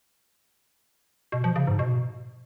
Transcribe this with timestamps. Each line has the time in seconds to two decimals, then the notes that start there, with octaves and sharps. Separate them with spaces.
1.32 B2
1.44 F3
1.56 C#3
1.67 G#2
1.79 B2